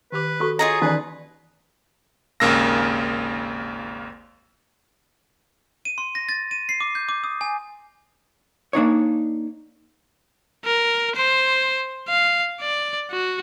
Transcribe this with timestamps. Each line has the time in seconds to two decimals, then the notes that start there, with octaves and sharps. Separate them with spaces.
0.12 D#3 G4 B4 D6
0.40 F#4 A4 C#6
0.59 F4 G#4 C#5 D#5 A#5
0.82 D#3 E3 C#4 D#4 B4 D5
2.40 G#1 D#2 C#3 A#3 E6 A#6
5.85 D#7
5.98 C6
6.15 A#6
6.29 A6
6.51 D#7
6.69 C7
6.81 D6
6.95 G6
7.09 D6
7.24 D#6
7.41 G#5
8.73 A#3 D4 D#4 C#5
10.65 A#4
11.15 C5
12.08 F5
12.61 D5
13.11 F#4